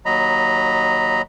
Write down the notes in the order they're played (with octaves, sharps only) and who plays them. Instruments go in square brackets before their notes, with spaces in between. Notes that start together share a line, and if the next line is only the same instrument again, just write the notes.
[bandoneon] D#2 F#3 D#5 A#5 B5